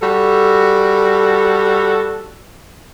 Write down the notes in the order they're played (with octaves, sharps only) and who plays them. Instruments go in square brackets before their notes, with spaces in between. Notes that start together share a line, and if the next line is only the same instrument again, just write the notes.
[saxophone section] G3 F#4 A4